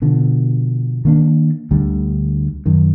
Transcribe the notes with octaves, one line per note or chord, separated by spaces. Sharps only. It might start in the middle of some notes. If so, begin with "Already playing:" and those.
B2 D3 F3
D#3 A#3 D4
D2 D3 G3
F#2 D#3